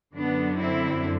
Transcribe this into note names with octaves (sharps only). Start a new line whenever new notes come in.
F#2 D3 B3 D4
C4 E4